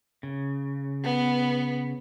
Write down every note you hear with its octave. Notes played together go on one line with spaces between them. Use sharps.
C#3
B3